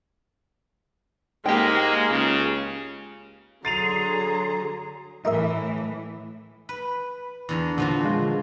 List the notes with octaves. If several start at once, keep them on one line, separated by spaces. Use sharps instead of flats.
G#2 G#3 A#3 G4 G5
C#2 C#3
D3 F#3 G#4 A#5 C6 A6 D#7 F7
A2 E3 D#4 A#4 E5
B4
E2 D3 A#4
A#2 D3 F3 F#4
G#3 F4